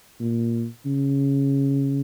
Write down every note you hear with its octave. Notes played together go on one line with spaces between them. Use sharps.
A#2
C#3